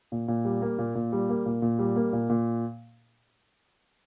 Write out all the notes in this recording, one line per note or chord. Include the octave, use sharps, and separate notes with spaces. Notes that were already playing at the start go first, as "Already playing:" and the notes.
A#2
A#2
G3
A#3
A#2
A#2
G3
A#3
A#2
A#2
G3
A#3
A#2
A#2